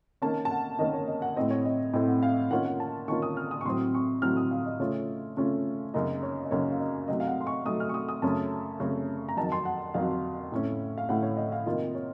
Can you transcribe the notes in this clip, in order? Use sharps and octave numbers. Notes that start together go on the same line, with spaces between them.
D#3 A#3 C#4 A5
A5
F#5
D#3 A#3 C#4 D#5
C#5
D#5
F#5
A2 A3 C4 D#5
C#5
D#5
A2 A3 C4 D#5
F#5
F5
D#3 A#3 C#4 F4 F#5
F#5
A5
D#3 A#3 C#4 F4 C#6
D#6
F6
D#6
C#6
A2 F#3 C4 C6
C#6
A2 F#3 C4 F6
D#6
F5
D#5
C#3 A3 C#4 F4 C#5
C#3 A3 C#4 F4
F#2 C#3 F#3 A#3 D#4 D#5
C#5
D#5
F#2 C#3 F#3 A#3 D#4 C#5
F5
D#5
C3 F#3 A3 D#4 D#5
F5
F#5
C6
C#6
C3 F#3 A3 D#4 D#6
F6
C#6
D#6
D#6
F#2 C#3 A3 C#4 A5
F#2 C#3 A3 C#4
A#5
F2 D#3 F#3 A5
C6
F#5
F2 D#3 F#3 F5
A2 A3 C#4
F5
A2 A3 C#4 F#5
C#5
D#5
F5
C3 D#3 A#3 F4 D#5
C#5